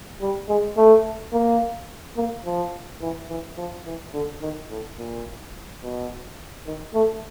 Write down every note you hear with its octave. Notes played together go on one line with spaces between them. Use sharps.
G3
G#3
A3
A#3
A#3
F3
E3
E3
F3
E3
D3
D#3
A2
A#2
B2
D#3
A3